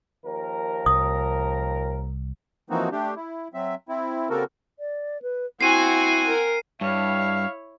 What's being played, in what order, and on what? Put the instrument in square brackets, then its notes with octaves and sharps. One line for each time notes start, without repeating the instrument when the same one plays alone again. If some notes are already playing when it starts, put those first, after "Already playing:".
[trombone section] D#2 F3 A#4
[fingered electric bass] C2 [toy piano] D#6
[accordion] E3 F3 A#3 C4 D#4 F#4
A3 D4 G4
E4
F#3 C4 E5
C4 E4
C#3 A#3 C4 F#4 A4 A#4
[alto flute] D5
B4
[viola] C4 F#4 [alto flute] E4 [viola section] F#5 G#5 [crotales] C7 D#7
[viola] A#4
[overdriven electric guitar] G2 [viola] E4 C#5 [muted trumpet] F5